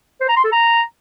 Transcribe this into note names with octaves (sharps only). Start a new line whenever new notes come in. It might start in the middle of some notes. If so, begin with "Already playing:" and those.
C5
A#5
C6
A4
A#5